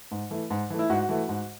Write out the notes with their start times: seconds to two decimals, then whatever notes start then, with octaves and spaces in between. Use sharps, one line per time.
0.11 G#2
0.31 E3 A3
0.50 G#2
0.70 E3 A3
0.79 E4
0.90 G#2 F#4
1.09 E3 A3
1.29 G#2